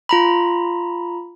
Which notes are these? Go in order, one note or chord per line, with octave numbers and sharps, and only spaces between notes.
F4 A#5 B5